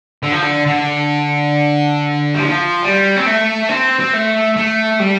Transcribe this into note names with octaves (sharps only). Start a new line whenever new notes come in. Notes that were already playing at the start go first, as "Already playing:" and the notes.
D3
F3
D3
D3
G3
F3
G3
C4
A3
C4
C4
A3
A3
G3